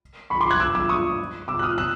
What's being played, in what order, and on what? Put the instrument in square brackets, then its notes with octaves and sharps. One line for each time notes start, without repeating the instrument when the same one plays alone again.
[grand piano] B5 C#6
C6 D6
F#6 G#6
D6 E6
D6 E6
C#6 D#6
D6 E6
F#6
D#6 F6
E6 F#6